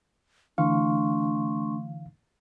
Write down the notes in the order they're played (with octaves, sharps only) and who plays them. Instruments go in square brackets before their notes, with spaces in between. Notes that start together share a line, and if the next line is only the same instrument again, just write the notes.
[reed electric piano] D3 E3 F5 [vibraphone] A3 C6 C#6 [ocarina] D4